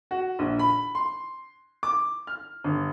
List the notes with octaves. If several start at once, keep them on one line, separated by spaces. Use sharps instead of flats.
F#4
A#1
B5
C6
D6
F6
G1